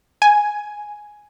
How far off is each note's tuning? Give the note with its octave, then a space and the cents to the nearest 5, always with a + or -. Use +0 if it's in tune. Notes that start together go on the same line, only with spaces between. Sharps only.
G#5 +5